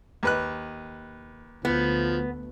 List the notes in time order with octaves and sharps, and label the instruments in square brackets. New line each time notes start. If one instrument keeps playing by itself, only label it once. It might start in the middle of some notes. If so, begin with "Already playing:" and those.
[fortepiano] D#2 B4 F#6
[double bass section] D2 A3 [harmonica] F3 [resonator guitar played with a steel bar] B3